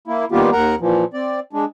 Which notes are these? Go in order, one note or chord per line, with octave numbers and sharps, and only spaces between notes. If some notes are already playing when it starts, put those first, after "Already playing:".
A#3 E4
D#3 G3 A#3 B3 F4 G4
D#2 A#4 F#5 A#5
A#2 E3 F3
C4 D5
G#3 D4